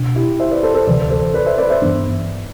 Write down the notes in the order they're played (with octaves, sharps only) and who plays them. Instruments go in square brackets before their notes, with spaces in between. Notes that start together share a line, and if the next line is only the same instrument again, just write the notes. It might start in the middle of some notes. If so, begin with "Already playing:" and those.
Already playing: [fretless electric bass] B2 D4
[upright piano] E4 G4
C5 E5
B4 D5
A4 C5
A4 C5
[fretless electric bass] D2 C3 E3 [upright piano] B4 D5
[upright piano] A4 C5
B4 D5
C5 E5
B4 D5
C5 E5
[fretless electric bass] G2 E3 B3 D4